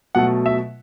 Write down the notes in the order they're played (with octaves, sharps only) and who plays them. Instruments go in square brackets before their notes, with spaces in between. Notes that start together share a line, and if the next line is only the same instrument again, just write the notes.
[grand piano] B2 F#3 A3 F#5
E5